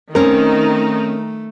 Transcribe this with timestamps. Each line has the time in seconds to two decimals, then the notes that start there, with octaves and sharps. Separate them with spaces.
0.15 D#3 A3 C4 C#4 D#4 A#4